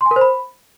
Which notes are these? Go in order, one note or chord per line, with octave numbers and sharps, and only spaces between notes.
C6
G#5
A#4
C5
B5